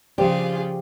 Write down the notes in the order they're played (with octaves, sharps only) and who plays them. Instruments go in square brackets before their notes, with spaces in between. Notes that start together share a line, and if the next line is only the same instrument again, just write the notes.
[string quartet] C#3 F4 G#4 [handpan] F3 C5 D5 [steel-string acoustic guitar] G4